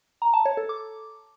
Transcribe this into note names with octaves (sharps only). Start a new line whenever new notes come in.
A#5
A5
C#5
A4
D6